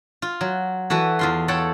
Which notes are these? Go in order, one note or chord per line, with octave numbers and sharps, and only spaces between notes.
F4
F#3
E3 F#4 A4 B4
E2 F4 C6
A4 C#5 F#5 G5 A5